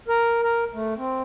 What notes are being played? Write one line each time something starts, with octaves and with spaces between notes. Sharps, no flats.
A#4
A#4
A3
C4